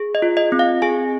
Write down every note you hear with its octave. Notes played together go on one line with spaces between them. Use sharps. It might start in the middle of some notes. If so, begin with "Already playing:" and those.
Already playing: G#4
D#5
F4
D#5
C4
F5
G#4 G#5